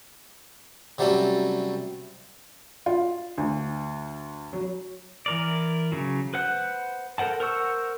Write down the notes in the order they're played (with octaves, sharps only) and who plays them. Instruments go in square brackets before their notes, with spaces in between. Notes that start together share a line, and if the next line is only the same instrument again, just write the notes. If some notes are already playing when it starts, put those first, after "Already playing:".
[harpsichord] C3 F#3 G3 A3 C#4
[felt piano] F4
D2
F#3
[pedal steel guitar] E3 A#4 D5
C#3 F#3
B4 C5 F#5 F#6
A4 A#4 C5 F#5 A5
A#4 C5 F#5 C#6 E6